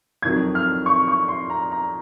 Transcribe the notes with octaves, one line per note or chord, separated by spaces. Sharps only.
F2 D#3 F#3 G#6
F6
C#6
C#6
C6
A#5
A#5